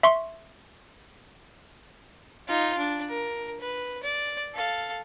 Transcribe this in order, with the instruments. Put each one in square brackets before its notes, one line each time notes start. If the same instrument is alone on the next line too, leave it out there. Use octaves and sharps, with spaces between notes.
[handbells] E5 C6 C#6
[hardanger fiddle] D#4 F4
D4
A#4
B4
D5
A4 F5